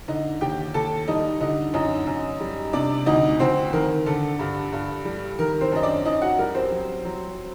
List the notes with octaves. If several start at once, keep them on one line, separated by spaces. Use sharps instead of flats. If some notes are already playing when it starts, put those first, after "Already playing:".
D3 D#4 D#5
D#2 G4 G5
D#2 A4 A5
G3 D#4 D#5
D3 D#4 D#5
F#2 D#4 D#5
F#2
G3
C3 D4 D5
D2 D#4 D#5
D2 C4 C5
D#3 A#4
D3 A4
G2
G2
G3
D#3 A#4
C4 C5
F#2 D#5
D4 D5
F#2 D#4 D#5
F#4 F#5
G3 A#4
C4 C5
F#3
F#3